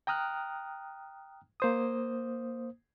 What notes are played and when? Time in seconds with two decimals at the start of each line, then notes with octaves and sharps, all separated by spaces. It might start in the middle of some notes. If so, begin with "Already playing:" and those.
0.07 G5 A#5 D#6 F6 F#6
1.60 A#3 C5 D#6